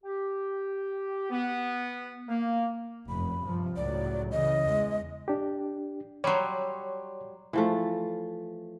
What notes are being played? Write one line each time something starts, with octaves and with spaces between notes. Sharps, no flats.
G4
B3
A#3
F1 F#2 B5
G2 C3 F3
C#2 A2 F#3 D5
C#3 E3 D#5
E2 G#3
D4 G4
F#3 G3 C#5 C6
E3 F3 A3